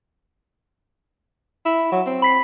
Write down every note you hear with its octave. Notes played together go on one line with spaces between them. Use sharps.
E4
F#3
C4
B5 B6 C7